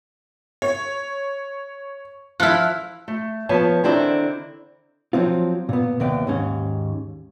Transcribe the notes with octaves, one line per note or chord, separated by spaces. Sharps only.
C#5
F3 E4 F6 F#6
A3
F3 B3 C#5 A5
D3 D#3 C4 E4 D5 E5
F3 F#3 C4 F4
A#2 B3
D#2 C3 B3 D5 G5
D#2 G#2 C#4